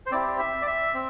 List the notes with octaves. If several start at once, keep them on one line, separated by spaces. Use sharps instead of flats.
C5
C4 E4 G4 D5
E5
D5
E5
C4